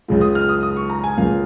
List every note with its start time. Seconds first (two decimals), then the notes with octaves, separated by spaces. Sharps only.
0.08 C#2 C#3 G#3 F4
0.21 D#6
0.35 F6
0.49 D#6
0.63 D#6
0.76 C#6
0.90 A#5
1.04 G#5
1.17 C#2 C#3 A#3 C#4 F4 F5